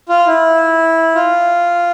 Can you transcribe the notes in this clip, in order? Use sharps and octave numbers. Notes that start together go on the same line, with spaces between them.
F4
E4
F4